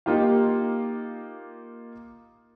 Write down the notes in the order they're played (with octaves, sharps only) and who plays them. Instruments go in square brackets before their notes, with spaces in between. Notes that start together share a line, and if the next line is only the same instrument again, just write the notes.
[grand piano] A#3 D#4 F4 G4 F5